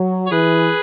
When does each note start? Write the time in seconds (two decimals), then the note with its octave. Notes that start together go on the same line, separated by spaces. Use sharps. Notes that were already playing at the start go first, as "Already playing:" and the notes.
Already playing: F#3
0.27 C#5
0.31 E3 G#4 B4